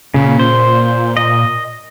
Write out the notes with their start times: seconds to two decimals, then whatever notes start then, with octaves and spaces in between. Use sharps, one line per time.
0.14 A#2 C#3
0.39 C5
1.17 D#5